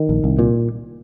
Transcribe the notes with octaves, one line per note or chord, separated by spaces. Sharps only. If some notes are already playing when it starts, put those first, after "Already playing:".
Already playing: D#3
A#1
C2
A#2